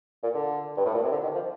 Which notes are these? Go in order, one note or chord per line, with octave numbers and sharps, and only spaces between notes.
A#2
D3
G2
A2
A#2
C3
D3
D#3
F3